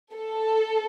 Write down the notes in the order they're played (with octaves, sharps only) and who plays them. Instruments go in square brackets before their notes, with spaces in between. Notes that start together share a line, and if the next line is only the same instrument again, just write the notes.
[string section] A4